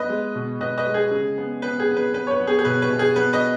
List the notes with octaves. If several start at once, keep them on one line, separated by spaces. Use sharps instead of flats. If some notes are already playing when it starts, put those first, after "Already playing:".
Already playing: B3 B4 D#5
G#3
B2
B2 B4 D#5
B4 D#5
G#3
G#4
C#3
B3
B3 B4
G#4
B3
B4
B3 B4
C#5
B4
B3
G#4
G#4
B2 B4
B4
B2
G#4
B3 B4
B4 D#5